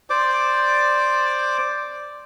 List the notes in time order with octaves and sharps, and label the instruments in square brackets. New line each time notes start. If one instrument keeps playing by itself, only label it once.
[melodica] C5 D5 D6